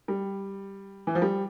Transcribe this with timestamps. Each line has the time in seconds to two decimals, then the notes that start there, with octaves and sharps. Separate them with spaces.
0.08 G3
1.07 E3
1.15 F3
1.22 G3